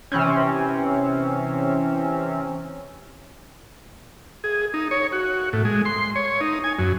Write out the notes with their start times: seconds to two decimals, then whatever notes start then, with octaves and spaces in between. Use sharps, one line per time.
0.12 C3 E3 C4 C#4
4.44 G#4
4.74 D#4
4.91 C#5
5.12 F#4
5.53 A2
5.65 G#3
5.85 C6
6.16 C#5
6.41 D#4
6.64 G#5
6.79 F#2